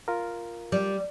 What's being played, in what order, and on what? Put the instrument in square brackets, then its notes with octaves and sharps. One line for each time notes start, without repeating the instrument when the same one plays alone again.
[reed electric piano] F4 A#4
[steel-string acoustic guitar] G3 [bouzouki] D5